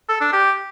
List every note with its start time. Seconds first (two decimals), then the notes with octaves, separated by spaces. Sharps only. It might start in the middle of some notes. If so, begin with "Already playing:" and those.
0.09 A4
0.21 D4
0.33 G4